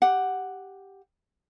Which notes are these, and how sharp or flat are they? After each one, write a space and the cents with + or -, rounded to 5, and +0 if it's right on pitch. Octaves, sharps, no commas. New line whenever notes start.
G4 +0 F#5 +0